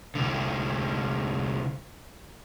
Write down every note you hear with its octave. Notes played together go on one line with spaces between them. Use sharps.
C2 D3